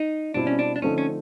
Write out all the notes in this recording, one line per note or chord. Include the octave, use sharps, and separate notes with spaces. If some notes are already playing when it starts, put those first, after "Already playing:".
Already playing: D#4
B2 G3 C4 D4 E4
C#4
D4
D4
D3 F3 A3 C4 C#4 D#4
C#4